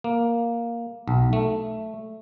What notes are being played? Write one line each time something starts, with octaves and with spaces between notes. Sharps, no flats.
A#3
B1
A3